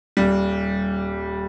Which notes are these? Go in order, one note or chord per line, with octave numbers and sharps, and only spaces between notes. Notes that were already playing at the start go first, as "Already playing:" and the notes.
D#1 G3